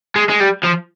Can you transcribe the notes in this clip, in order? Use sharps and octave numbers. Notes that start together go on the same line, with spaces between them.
G#3
G#3
G3
F3